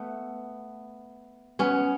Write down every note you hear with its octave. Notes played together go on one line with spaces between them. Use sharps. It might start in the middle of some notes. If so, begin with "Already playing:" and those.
Already playing: A3 B3
B3 C#4